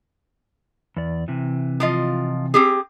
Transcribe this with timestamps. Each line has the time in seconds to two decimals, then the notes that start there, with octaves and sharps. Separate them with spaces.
0.97 E2 D5
1.28 C3 E3
1.80 F3 F4 D#5
2.54 C4 G4 G#4